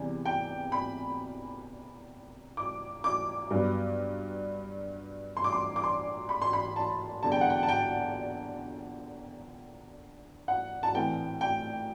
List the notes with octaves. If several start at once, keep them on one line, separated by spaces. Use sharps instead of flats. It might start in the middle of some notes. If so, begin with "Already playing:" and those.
Already playing: E2 C3 E3 G3
G5
B5
D6
D6
G2 F#3 B3
C6
D6
C6
D6
C6
B5
C6
B5
A5
E2 D3 G3 A5
G5
F#5
G5
A5
G5
F#5
A5
A2 E3 A3 C4 G5
G5